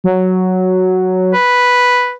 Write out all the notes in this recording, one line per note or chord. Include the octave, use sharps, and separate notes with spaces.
F#3
B4